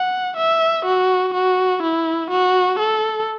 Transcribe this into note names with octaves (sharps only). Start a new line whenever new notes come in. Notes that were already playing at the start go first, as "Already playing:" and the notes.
Already playing: F#5
E5
F#4
F#4
E4
F#4
A4